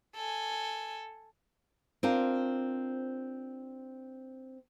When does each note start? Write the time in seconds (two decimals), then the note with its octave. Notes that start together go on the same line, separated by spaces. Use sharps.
0.15 A4 G#5
2.03 C4 D4 F4 A#4 C5